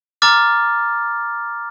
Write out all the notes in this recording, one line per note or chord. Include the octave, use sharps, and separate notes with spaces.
A#5 D6 F6 A6